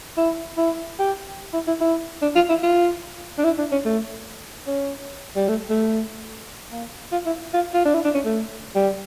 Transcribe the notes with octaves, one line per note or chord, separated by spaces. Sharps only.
E4
E4
G4
E4
E4
E4
D4
F4
E4
F4
D4
E4
D4
C#4
A3
C#4
G3
A3
A3
A#3
F4
E4
F4
F4
D4
E4
D4
C#4
A3
G3